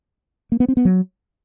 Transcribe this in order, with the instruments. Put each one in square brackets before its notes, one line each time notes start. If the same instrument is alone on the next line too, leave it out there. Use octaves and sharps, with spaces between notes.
[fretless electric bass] A#3
B3
C4
B3
F#3